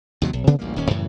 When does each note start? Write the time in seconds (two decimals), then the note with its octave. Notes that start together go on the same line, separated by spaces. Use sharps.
0.22 D#2 C3 F#3
0.33 B1
0.47 C3 B3 D4
0.59 A1 D2 G3 A#3
0.76 D#1 D#2 C#4
0.91 F#2 A2 C#3 E3